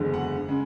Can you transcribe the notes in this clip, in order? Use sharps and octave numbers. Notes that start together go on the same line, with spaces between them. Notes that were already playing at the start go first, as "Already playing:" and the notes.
Already playing: F#1 E2 D3 G#3
F#5
C#3 G#3